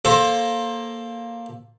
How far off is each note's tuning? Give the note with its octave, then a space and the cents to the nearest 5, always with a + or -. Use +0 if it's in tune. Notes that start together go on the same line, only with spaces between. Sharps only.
A#3 +0 A4 +0 C5 +20